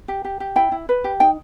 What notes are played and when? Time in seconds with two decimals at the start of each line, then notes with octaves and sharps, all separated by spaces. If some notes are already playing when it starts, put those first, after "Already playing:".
0.08 G4
0.25 G4
0.40 G4
0.56 E4 G5
0.72 E4
0.89 B4
1.04 G4
1.20 D#4 G5